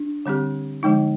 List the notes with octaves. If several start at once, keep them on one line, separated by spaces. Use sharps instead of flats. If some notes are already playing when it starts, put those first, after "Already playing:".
Already playing: D4
D3 G3 C4 G4
D3 F3 G#3 D#4